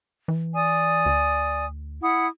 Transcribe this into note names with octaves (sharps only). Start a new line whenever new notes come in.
E3
D5 G#5 D#6
D2
E4 F#5 D#6